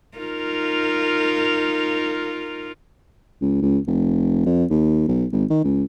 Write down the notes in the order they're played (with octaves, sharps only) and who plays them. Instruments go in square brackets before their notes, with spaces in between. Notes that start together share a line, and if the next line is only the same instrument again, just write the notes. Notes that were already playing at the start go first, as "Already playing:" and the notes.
[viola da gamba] D#4 F4 A#4
[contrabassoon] C#2
C#2
F1
F2
D#2
B1
G#1
D#3
C#2